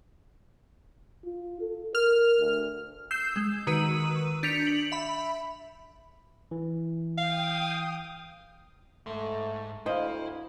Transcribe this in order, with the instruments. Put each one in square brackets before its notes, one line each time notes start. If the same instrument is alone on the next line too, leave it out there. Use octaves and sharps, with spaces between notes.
[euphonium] F4
A4
[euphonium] A#4 [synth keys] F6
[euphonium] D2
[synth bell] E6 G6 C7 E7
G#3
D#3 F#4 B4 E6 D#7
D4 G6 B6 C#7 D7 F7
F#7
E5 B5
[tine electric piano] E3
[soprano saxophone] F5 [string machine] G5 D#6
[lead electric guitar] G#2 C6 [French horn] A3
[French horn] D2 [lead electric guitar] E4 [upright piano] C5 F5 [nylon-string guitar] D#5